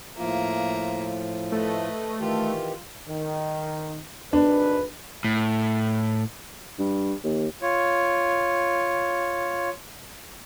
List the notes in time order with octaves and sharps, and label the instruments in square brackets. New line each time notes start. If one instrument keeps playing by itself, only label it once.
[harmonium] A2 F3 F4 [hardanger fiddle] A#3 E5
[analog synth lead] A3 [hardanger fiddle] B4 D#5
[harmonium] D#3 E3 G4 [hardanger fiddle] F4
[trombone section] D#3
[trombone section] G#1 B4 [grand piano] D4
[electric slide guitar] A2
[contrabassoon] G2
D#2
[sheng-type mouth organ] F4 C#5